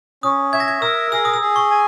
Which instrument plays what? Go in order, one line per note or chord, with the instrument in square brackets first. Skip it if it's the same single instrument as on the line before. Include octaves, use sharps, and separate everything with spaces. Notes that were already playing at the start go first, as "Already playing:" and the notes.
[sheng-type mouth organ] C#4 [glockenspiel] D#6
[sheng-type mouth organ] E5 [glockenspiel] G#6
[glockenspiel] A#6
G#6
[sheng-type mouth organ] A#4 [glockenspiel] E6
[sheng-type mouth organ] G#4 [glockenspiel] E6
[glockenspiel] D#6
E6
[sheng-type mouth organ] G#4
[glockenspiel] C#6
[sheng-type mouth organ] G#5